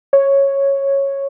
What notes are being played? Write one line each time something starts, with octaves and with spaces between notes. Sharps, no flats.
C#5